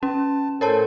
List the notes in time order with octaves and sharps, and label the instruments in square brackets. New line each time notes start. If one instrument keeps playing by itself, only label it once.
[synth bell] C#4 [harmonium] A5
[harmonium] A2 A4 C5 [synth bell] A#4 C#5 A5